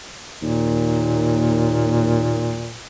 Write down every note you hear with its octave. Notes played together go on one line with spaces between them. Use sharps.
D#2 A#2